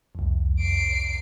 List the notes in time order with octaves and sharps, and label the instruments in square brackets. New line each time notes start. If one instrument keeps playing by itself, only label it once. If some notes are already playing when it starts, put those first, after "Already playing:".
[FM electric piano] C2 F2
[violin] C7 D7